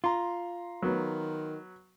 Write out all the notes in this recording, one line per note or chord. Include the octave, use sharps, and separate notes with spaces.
F4 A#5 C6
D#3 F#3 B3